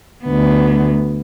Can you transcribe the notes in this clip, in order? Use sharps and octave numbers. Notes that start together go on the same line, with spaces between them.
D2 B3